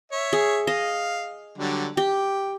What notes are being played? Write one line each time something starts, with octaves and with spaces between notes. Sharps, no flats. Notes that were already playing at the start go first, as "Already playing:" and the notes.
C#5 E5
G#4
D#5 F5
D3 F#3 G3
G4 G5